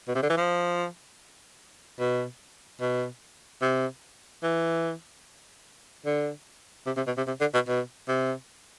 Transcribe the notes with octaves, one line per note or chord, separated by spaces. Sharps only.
B2
C3
D3
E3
F3
B2
B2
C3
E3
D3
C3
C3
B2
C3
C3
D3
B2
B2
C3